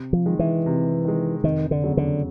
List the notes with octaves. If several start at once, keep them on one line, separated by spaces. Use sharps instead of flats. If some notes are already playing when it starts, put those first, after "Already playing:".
Already playing: C3
F3
D#3 G#3
E3
C3
D#3 G#3
F1 D#3
D3
E2 C#3 F#3
D3